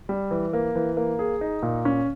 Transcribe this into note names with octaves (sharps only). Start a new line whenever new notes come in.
G3
E3
A#3
E3
A#3
G#4
D#4
A#2
C#4